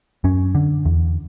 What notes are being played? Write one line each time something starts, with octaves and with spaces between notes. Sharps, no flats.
F#2 C#4
D3
E2